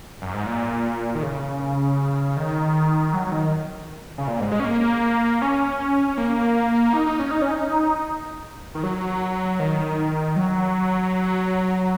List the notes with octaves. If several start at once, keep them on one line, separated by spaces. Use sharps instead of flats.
F#2
G#2
A#2
D#3
C#3
D#3
F#3
F#3
D#3
C#3
A#2
G#2
G#3
C#4
A#3
C#4
C#4
C#4
A#3
D#4
D#4
C#4
D#4
C#4
D#4
D#3
F#3
D#3
F#3